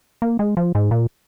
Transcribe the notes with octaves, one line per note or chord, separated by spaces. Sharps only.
A#3
G#3
F3
G#2
A#2